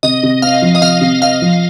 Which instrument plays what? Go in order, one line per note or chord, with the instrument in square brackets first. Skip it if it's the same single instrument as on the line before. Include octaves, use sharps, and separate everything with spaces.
[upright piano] C3 [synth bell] D#5
[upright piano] C3
[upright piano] C4 [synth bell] F5
[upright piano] F3
[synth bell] D#5
[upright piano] C3 [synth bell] F5
[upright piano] C3
[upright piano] C4 [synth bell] F5
[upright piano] F3